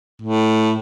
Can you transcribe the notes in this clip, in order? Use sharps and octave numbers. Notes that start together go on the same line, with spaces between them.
A2